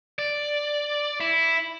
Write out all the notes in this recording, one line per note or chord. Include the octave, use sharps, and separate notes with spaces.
D5
E4